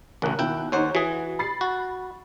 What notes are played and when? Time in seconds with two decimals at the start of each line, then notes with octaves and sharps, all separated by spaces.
0.22 A1 D2 C#3 A#4 F#6
0.39 D#2 B2 D#3 E4 G5
0.72 D#2 D#4 C5 C#5 F#5
0.95 E3 F#4 G#4
1.39 B5 A6 C7
1.61 F#4